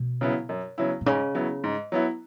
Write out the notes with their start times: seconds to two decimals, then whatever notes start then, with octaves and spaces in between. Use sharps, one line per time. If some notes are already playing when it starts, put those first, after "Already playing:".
Already playing: B2
0.21 C#3 F#3 B3 E4
0.49 F#2
0.78 C#3 F#3 B3 E4
1.01 B2
1.06 G#2 C#3
1.35 F#3 B3 E4
1.64 G#2
1.92 F#3 B3 E4